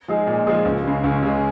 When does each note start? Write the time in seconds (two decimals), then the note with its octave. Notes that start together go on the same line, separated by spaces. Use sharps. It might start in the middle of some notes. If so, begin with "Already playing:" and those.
0.08 F3 G#3 D#4 G#4
0.27 A#2
0.47 F3 G#3 D#4 G#4
0.65 C#2
0.84 C#3 G#3
1.04 C#2
1.22 C#3 G#3